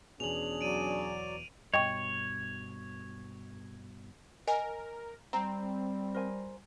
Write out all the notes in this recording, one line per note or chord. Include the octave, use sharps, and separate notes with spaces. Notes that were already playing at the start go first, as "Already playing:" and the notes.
E2 B2 C#4 D4 G#4 F7 F#7
F#3 D5 D7 D#7
G2 B2 C#5 D#5 G5 C#6
A#4 D#5 G#5
G3 C4 A#5
A#4 C5 G#5